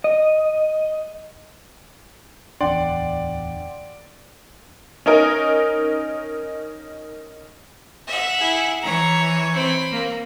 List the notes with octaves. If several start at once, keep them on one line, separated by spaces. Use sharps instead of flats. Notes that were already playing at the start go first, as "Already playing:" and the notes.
D#5
D1 E2 D4 D5 F#5 G5 C6
C#4 D#4 A#4
E5 F#5
E4 G#4
E3 C#5 A#5
C4 B5
A#3